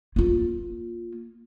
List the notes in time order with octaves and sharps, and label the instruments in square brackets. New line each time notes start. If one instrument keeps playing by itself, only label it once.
[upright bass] A#3 F4